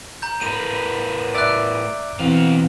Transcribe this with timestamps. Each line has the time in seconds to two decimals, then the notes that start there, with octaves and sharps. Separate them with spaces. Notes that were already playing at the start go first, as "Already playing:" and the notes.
0.22 A#5 G6
0.41 A2 A#4 B4 D#7
1.35 D5 E5 D6 F#6 D7
2.19 B2 E3 C4 F5